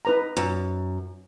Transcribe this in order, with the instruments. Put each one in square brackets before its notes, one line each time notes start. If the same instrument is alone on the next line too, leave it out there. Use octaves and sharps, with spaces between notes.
[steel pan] D#4 B4 A#5
[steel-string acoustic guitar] F#2